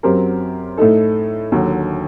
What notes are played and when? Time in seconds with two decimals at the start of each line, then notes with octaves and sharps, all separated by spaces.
0.03 F#2 F#3 C4 G4 A#4
0.77 A2 A3 D#4 A4
1.52 D#2 D3 F#3